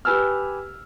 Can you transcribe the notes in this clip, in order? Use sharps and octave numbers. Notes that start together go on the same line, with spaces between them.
G4 B4 G#5 E6 F6